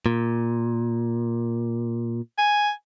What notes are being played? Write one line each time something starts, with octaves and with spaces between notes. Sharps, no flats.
A#2
G#5